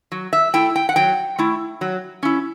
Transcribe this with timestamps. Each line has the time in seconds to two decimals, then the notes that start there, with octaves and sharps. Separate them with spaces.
0.12 F#3
0.33 E5
0.54 A3 E4 G5
0.76 G5
0.89 F#5
0.96 F#3 G5
1.39 A3 E4
1.81 F#3
2.23 C#4 E4